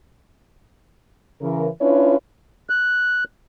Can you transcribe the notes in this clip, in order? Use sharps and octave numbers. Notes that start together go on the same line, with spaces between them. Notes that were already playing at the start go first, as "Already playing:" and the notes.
C#3 E3 A#4
C#4 D4 E4 F4 B4 C#5
F#6